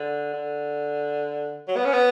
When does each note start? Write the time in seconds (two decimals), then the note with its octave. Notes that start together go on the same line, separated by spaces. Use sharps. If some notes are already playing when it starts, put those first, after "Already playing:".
Already playing: D3
0.33 D3
1.68 F#3
1.76 B3
1.85 C#4
1.92 B3